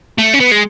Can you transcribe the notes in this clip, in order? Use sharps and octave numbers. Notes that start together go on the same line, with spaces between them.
A3
C#4
B3
G#3